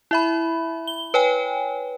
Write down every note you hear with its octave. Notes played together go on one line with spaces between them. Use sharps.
E4 E5 B5
G7
B4 C#5 G5 G#5